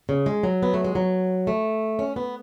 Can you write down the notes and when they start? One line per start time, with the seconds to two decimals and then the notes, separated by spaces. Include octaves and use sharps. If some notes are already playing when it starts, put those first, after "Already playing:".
0.09 C#3
0.26 G#3
0.43 F#3
0.63 B3
0.74 A3
0.84 G#3
0.95 F#3
1.47 A3
1.99 C#4
2.16 B3